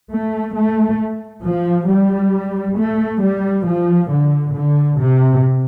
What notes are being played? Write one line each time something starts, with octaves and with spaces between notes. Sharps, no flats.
A3
A3
F3
G3
A3
G3
F3
D3
D3
C3